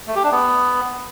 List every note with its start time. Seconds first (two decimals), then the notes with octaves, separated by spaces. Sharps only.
0.07 A3
0.15 G4
0.24 D4
0.32 B3